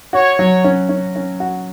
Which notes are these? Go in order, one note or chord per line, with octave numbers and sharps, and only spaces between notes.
F#4 C#5
F#3
C#4
C#4
C#4
F#4